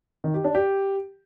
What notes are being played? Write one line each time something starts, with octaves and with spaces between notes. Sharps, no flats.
D#3
G4
D4
G4